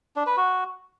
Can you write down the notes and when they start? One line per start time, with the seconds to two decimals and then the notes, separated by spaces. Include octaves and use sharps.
0.16 D4
0.26 B4
0.37 F#4